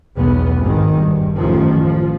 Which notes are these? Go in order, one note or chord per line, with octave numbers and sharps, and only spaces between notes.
B1 E2 B3
G#1 D#3
G2
A1 F#2 D#3 F3
F3